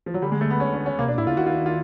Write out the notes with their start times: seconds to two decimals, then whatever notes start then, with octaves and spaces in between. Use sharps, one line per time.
0.06 F3
0.14 F#3
0.22 D3 G3
0.32 G#3
0.41 A3
0.50 B3
0.60 C#4
0.74 C#4
0.86 C#4
0.99 C3 A#3
1.08 B2 D4
1.18 A2 E4
1.27 C#3 F4
1.37 D#3 F#4
1.46 F4
1.66 F4